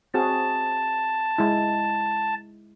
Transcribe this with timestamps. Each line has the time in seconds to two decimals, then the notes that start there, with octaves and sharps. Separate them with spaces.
0.14 C4 F#4 G#4 A5
1.38 G#3 E4